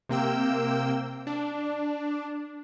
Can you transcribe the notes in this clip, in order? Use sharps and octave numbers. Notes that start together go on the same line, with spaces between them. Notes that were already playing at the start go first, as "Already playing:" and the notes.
C3 A#3 G5 E6
D4